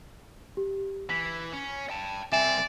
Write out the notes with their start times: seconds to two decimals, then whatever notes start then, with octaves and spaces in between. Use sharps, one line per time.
0.57 G4
1.10 E3 B6
1.53 C#4
1.90 G5 A5
2.32 C2 C4 D5 E5 G#5 E7